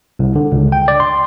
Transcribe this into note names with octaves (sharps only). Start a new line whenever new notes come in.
C2
D3
C#2
G5
D5
C6